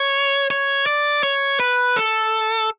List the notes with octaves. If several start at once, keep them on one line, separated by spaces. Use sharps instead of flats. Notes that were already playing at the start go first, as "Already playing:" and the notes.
Already playing: C#5
C#5
D5
C#5
B4
A4